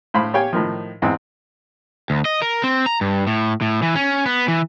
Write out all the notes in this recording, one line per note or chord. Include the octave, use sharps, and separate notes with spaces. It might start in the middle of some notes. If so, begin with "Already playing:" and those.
A2 C5 F5 B5
G4 C#5 F5 G5 G#5
A2 D#3 F3
E2 G#2 C4 E4
D2
D#5
A#4
C4
A#5
G2
A2
A2
E3
C#4
B3
E3